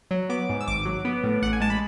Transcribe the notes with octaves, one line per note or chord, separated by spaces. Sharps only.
F#3
B3 D6
G#2
E6
G#1 D6
F#3
B3
A2
A1 F#5
G#5
G#3 A5
B5